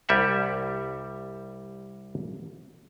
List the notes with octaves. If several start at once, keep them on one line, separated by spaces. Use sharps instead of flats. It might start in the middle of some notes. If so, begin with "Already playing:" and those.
C2 G3 G4 E5 F#5